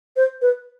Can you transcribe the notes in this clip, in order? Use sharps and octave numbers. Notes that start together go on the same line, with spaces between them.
C5
B4